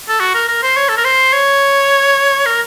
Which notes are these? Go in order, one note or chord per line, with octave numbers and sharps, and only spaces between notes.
A4
F#4
A#4
A#4
C5
C#5
A4
A#4
C5
C#5
A#4